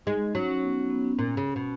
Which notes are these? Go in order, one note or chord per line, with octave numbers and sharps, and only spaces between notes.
G#3 D#4
D#4
F#3 C#4
C#4
B3
B3
C#4
A#2
C#3
B2